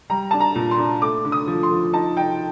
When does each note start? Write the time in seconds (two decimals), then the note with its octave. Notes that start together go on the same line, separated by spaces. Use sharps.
0.10 G3 A#5
0.31 D4 A5
0.40 A#5
0.55 A#2
0.71 C6
0.78 D4
1.02 A3 D6
1.25 D3
1.32 D#6
1.48 F3
1.63 C6
1.71 F3
1.93 D#4 A5
2.17 D#4 G5